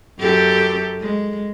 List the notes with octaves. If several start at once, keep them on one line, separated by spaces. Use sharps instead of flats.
F#2 G4 A4
G#3